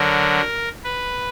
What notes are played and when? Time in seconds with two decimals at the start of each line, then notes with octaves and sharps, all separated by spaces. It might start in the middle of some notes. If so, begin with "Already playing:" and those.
Already playing: D3 F#3 A#4
0.84 B4